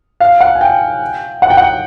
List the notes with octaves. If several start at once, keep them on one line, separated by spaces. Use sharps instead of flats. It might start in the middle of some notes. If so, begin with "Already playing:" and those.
F5
F#5
G#5
G5
F#5
G5
F#5